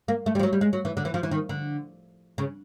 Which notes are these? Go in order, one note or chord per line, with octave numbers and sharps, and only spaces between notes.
A#3
A3
G3
F3
F#3
G3
G#3
F#3
E3
D3
E3
F3
E3
D#3
D3
C#3